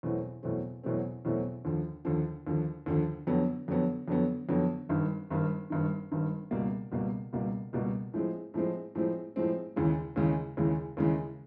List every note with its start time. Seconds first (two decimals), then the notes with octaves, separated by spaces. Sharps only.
0.03 E2 B2 F#3 A3 C4
0.43 E2 B2 F#3 A3 C4
0.83 E2 B2 F#3 A3 C4
1.25 E2 B2 F#3 A3 C4
1.65 D#2 D3 F3
2.05 D#2 D3 F3
2.47 D#2 D3 F3
2.86 D#2 D3 F3
3.27 F2 D3 F#3 B3
3.68 F2 D3 F#3 B3
4.08 F2 D3 F#3 B3
4.49 F2 D3 F#3 B3
4.89 G#1 G2 D#3
5.30 G#1 G2 D#3
5.70 G#1 G2 D#3
6.12 G#1 G2 D#3
6.51 C#2 B2 G3 A#3
6.92 C#2 B2 G3 A#3
7.33 C#2 B2 G3 A#3
7.73 C#2 B2 G3 A#3
8.14 A2 F3 G#3 C4
8.54 A2 F3 G#3 C4
8.95 A2 F3 G#3 C4
9.36 A2 F3 G#3 C4
9.76 D#2 C#3 E3 G#3
10.16 D#2 C#3 E3 G#3
10.57 D#2 C#3 E3 G#3
10.97 D#2 C#3 E3 G#3